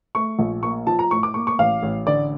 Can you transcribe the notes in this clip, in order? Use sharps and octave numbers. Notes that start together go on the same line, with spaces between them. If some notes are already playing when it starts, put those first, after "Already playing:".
A3 C#6
A#1
A#3 C#6
F3 A5
A#5
A2 C#6
D6
A#3 C#6
C#6
A1 F5
A1
D3 D5